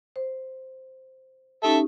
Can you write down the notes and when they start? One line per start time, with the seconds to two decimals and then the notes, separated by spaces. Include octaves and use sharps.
0.16 C5
1.63 C#4 D#4 G4 A4 E5